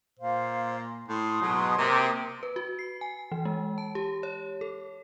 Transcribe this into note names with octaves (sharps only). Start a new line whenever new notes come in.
A#2 C5 F5
A2 C6 D#6
G#2 B2 F#3
C3 A#3
B4
F#4
C7
G#5
E3
G#3
A5
G4
C#5
A4